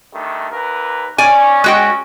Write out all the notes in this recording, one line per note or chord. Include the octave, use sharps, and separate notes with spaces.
G2 D#3 A3
D#2 A#4 B4
C#4 D5 G#5
G#3 F#4 G5